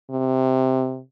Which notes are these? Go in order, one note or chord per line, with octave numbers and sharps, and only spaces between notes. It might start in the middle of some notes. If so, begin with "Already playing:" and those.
C3